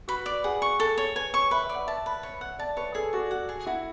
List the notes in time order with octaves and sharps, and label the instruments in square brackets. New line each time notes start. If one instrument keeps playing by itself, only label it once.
[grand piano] F#4 [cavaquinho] B4
[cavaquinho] D5
[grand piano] G#4 [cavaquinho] F#5
[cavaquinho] C#6
A4
C#5
[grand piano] B4 [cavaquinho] G#5
[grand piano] C#5 [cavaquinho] C#6
[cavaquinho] B4 [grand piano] E5
[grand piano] E5
[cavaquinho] D5
[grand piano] F#5
[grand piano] E5 [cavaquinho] A5
[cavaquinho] B4
C#5
F#5
[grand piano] D5 [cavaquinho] A5
[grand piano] B4 [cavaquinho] C#5
[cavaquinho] G#4 [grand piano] A4
[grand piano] F#4 [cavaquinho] D5
[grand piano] F#4 [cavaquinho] F#5
[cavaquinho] G#4
[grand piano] E4 [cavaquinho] F#4